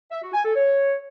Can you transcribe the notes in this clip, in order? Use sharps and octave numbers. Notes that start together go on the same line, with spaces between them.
E5
F#4
G#5
A4
C#5